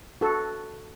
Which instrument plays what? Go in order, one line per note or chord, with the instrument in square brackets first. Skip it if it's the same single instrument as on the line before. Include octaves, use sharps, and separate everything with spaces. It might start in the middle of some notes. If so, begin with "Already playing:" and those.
[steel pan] F#4 A4